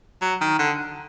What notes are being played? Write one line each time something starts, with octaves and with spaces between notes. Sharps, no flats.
F#3
D#3
D3